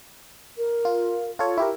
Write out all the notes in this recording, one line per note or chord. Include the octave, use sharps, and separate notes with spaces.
A#4
F4
F4 A4 C#5
E4 G4 A#4